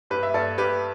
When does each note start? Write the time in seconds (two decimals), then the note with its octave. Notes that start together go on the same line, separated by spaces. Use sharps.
0.10 G2 G4 B4
0.23 E5
0.34 G2 A4 D5
0.58 G2 G4 B4